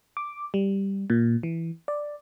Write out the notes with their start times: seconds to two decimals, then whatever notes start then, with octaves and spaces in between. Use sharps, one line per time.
0.17 D6
0.54 G3
1.10 A#2
1.43 E3
1.88 D5